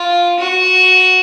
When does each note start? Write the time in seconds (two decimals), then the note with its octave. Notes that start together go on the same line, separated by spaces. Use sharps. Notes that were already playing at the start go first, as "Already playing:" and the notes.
Already playing: F4
0.39 F#4